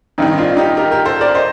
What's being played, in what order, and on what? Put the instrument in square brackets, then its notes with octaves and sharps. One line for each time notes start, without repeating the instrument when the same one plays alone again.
[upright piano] A1 G2 D#3 C4 D#4
D4 F4
D#4 G4
G4 A#4
G4 A#4
A4 C5
A#4 D5
C5 D#5